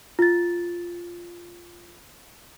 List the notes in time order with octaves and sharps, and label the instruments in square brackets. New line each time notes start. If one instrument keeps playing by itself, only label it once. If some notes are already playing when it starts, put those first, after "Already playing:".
[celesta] F4 A6